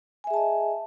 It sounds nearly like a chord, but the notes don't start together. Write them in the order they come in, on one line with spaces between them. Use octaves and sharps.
G#5 E5 G#4 A5 D#5